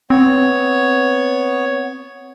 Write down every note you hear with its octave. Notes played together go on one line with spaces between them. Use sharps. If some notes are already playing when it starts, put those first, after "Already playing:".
B3 C4 C#5